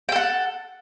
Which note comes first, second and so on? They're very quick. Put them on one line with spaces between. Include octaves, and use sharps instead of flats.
G5 A4 F#5